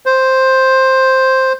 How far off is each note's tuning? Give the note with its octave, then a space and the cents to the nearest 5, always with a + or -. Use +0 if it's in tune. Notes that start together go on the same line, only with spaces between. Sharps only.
C5 +5